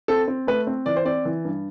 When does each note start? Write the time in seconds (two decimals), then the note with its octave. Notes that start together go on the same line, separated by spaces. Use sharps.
0.08 C4 A4
0.28 C4
0.47 A3 B4
0.67 C4
0.86 E3 D5
0.96 C5
1.05 C4 D5
1.25 E3
1.45 G2